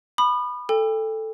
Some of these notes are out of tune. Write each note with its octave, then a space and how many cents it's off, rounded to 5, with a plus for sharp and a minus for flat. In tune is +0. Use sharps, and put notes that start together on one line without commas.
B5 +0 D#6 -40
A4 +0 G5 +35